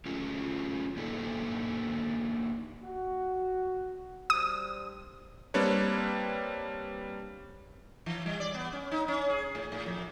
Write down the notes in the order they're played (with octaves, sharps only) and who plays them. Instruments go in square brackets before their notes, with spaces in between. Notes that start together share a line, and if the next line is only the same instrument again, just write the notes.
[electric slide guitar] A3 C#4 F4
A#3 D4 D#4 G4 A4
[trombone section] F#4
[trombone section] G3 D4 C5 [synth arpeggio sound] D#6
[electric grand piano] G3 A#3 C4 D4 B4 C#5
[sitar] E3
G3
D5
B3
C#4
D#4
C#4
G#4
A2
A2
F2